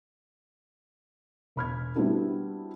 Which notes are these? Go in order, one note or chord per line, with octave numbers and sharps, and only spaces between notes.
E1 B5 F6 G#6
G3 B3 C4 D4 E4 F#4